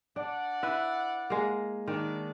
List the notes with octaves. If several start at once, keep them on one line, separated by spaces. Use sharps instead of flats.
D4 D5 F#5
E4 B4 E5
G#3 A#3
D#3 D4 D#4 D5